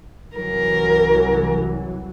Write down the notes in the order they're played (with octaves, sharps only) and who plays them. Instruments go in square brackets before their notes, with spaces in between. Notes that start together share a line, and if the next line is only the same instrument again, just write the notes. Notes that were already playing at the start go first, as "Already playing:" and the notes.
[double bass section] C2 E3 F#3 [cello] A#4